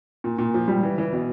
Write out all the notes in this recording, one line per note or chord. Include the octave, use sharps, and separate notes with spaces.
A#2
A#2
F3
G3
E3
E3
B2